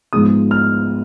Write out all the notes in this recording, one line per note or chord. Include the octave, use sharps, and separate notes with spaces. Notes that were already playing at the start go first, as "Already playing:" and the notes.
G#2 F3 G#3 B3 D#6
F6